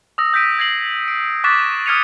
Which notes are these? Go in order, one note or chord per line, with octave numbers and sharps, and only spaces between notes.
D#6 E6 A#6
E6 G6 A#6 B6 D7 D#7
G#6 A#6 C7 F#7
D7
C#6 D6 F#6 A6 B6 E7
D#6 F6 G#6 C#7 D#7 F7